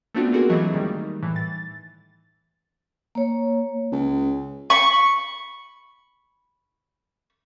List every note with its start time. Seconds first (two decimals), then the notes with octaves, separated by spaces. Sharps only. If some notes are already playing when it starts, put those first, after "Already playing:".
0.15 A3 B3 C4 D4 F4 F#4
0.32 A#3 C4 F#4 G#4 A#4
0.49 E3 F#3 A3 A#3 G#4 D#5
0.71 D#3 G3 D#4
1.22 A2 E3
1.36 A6
3.15 A#3 C#5
3.92 C#2
4.70 B5 C#6